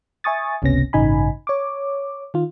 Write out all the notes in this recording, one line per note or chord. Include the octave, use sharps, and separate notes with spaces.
E5 G#5 C#6 D#6 A6
G1 C#2 C3 B3 C#4 A#6
A1 G2 C#3 D#4 G#5 B5
C#5 D6
D#3 F4